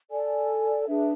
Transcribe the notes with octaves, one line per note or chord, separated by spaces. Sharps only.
A4 D5 G#5
D4 G#4 B4 E5